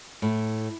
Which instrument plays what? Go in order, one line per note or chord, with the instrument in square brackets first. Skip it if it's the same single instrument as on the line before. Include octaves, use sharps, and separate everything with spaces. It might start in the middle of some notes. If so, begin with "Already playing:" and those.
[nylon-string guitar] A2